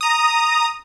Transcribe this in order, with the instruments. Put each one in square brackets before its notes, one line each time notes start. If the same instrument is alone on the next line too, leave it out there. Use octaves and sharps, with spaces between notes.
[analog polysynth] A#5 D#6